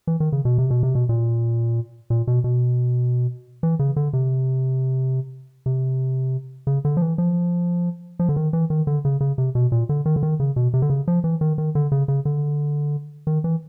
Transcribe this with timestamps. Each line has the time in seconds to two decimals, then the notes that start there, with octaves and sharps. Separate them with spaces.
0.07 E3
0.20 D#3
0.32 C#3
0.45 B2
0.58 C3
0.70 B2
0.83 C3
0.95 B2
1.09 A#2
2.10 A#2
2.27 B2
2.44 B2
3.63 E3
3.79 C#3
3.96 D3
4.13 C3
5.66 C3
6.67 C#3
6.85 D3
6.97 F3
7.01 E3
7.18 F3
8.19 F3
8.29 D3
8.36 D#3
8.53 E3
8.70 D#3
8.87 D3
9.05 C#3
9.21 C#3
9.38 C3
9.55 B2
9.72 A#2
9.89 D3
10.06 D#3
10.16 D3
10.23 D#3
10.40 C#3
10.56 B2
10.74 C3
10.82 D3
10.90 C#3
11.08 F3
11.24 E3
11.41 D#3
11.58 D#3
11.75 D3
11.92 C#3
12.08 C#3
12.25 D3
13.27 D#3
13.44 E3